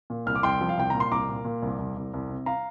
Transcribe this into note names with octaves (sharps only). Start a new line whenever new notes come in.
A#2
C2 F6
D6
C2 G5 C6
F3
F5
C2 G5
A#2 A#5
C6
C2 A#5 D6
A#2
A#2
C2
C2
C2
C2
C3
F5 A#5